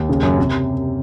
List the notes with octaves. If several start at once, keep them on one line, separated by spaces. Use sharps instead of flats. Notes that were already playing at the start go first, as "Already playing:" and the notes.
Already playing: D#2
C#3
F#2
C3